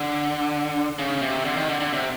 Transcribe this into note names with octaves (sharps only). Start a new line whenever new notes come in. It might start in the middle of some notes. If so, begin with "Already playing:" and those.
Already playing: D3
C#3
C3
D3
D#3
D3
D3
C3